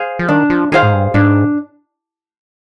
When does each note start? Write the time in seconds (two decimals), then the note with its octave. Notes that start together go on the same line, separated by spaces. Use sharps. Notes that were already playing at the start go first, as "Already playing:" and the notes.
Already playing: G#4 C5 F5
0.19 F3
0.28 D#3 D4
0.50 F3
0.72 D#3 G#4 C5 F5
0.83 G#2
0.93 G2
1.14 G#2 D4